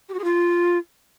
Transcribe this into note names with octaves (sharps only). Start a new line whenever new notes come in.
G4
F#4
G#4
F4